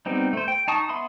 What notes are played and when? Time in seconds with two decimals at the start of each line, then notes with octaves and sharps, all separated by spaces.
0.06 G3 B3 C4 D#4
0.33 A3 C5
0.48 G5
0.68 D#4 A5 C#6 D#6
0.89 B3 E5 B5 C6 D#6